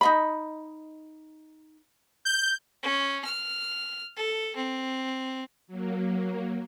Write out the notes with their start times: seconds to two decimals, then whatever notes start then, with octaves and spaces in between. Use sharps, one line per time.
0.01 D#4 D#5 B5
2.25 G6
2.83 C#4
3.25 F6
4.16 A4
4.56 C4
5.67 F#3 A#3